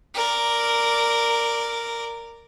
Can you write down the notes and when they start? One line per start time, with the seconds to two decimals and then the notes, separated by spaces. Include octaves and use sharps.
0.15 A#4 D5